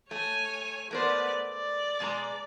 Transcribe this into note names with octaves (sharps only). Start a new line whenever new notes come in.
A3 C#5 G#5
A3 B3 A#4 C5 D5
D5
B2 G#3 A#5